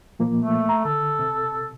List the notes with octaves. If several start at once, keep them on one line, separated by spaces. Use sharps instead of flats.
A#2 F3 A#3
A3
A#5
D3 A4
C3